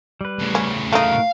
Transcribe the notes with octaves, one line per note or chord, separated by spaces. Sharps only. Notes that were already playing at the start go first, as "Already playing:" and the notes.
G3 B4
A2 C#3
C#4
A3 D#4 F#4 A#4 F5